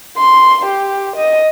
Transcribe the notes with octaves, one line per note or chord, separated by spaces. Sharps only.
C6
G4
D#5